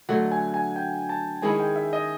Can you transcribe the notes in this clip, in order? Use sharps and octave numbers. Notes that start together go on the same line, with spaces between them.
D3 F#3 A3 F#5
G#5
G#5
G5
A5
D#3 G#3 C#4 E4 G#5
G5
E5
D#5